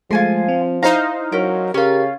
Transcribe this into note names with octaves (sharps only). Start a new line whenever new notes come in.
F3 G#3 A3 F4 G#5 C6
C4
D#4 E4 C5 F5 A#5
F#3 C#4 A#4
C#3 C#4 F4 G4 A#4